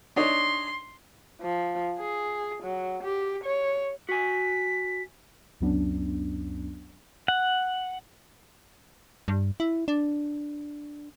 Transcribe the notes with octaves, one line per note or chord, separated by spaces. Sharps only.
D4 D#4 C#5 C6
F3
G#4
F#3
G4
C#5
F#4 G#5 B6
C#2 F#2 F#3 B3 C#4 D4
F#5
G2
E4
D4